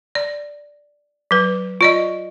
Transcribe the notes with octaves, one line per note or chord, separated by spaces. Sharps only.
D5
F#3 B4
F4 D5 D#5